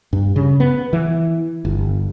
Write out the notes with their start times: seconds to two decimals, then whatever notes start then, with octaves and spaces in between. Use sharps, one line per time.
0.13 G2
0.36 C#3
0.60 B3
0.93 E3
1.65 G1